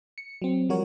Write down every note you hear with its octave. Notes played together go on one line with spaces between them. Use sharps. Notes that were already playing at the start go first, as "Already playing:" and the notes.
C#7
F#3 C4
F3 G3 F#4 A#4 C#5